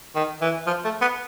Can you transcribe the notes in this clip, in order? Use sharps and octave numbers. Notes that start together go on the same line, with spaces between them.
D#3
E3
F3
A3
B3